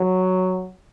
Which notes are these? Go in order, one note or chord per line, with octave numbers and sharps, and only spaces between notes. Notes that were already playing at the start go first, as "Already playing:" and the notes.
Already playing: F#3